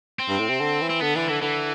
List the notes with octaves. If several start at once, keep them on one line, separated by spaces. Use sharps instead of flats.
C4
G2
A2
C3
D3
E3
C4
D3 B3
D3 E3
D3 E3
D3 E3